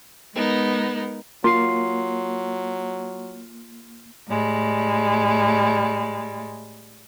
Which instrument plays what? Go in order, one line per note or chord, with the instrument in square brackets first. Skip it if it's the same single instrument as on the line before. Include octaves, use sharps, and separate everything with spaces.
[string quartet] G#3 B3 D#4 A#4
[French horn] F#3 [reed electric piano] A#3 [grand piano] F4 [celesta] C6 C7
[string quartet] A2 G3 G#3